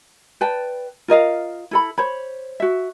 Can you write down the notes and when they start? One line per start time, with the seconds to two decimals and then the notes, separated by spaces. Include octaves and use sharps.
0.41 B4 D5 G5 A5
1.08 F4 A#4 D#5 F5
1.71 E4 A4 B5
1.98 C5 C#5 B5
2.60 F#4 E5